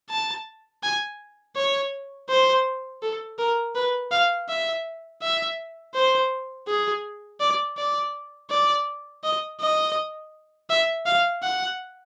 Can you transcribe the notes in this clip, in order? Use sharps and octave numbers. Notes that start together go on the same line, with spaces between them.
A5
G#5
C#5
C5
A4
A#4
B4
F5
E5
E5
C5
G#4
D5
D5
D5
D#5
D#5
E5
F5
F#5